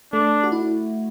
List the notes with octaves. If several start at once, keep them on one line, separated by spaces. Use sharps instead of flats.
A3 D4
F#4
E4